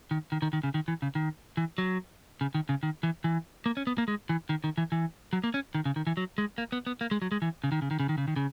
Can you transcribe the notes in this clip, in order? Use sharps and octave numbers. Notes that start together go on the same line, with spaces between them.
D#3
D#3
D#3
D#3
C#3
D#3
E3
C#3
D#3
E3
F#3
C#3
D#3
C#3
D#3
E3
E3
A#3
C#4
B3
A#3
G#3
E3
D#3
D#3
E3
E3
F#3
A#3
C#4
D#3
C#3
D#3
E3
F#3
G#3
A#3
B3
B3
A#3
G#3
F#3
G#3
E3
C#3
D#3
C#3
D#3
C#3
D#3
C#3
D#3
C#3